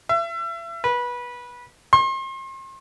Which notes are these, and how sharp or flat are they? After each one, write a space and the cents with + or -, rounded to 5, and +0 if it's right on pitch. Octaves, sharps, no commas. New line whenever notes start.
E5 +35
B4 -20
C6 +40